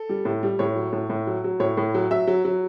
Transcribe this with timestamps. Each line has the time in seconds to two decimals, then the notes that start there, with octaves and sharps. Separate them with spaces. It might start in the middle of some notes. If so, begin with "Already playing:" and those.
Already playing: A4
0.09 G3
0.25 A2
0.43 G3
0.59 A2 C#5
0.76 F#3
0.93 A2
1.10 A2
1.27 F#3
1.44 F#3
1.60 A2 C#5
1.77 A2
1.94 F#3
2.11 F#3 E5
2.27 F#3
2.45 F#3